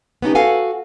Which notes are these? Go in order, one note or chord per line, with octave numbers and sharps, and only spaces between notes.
B3 C#4 D#4 G4
F#4 A4 F5 F#5 G#5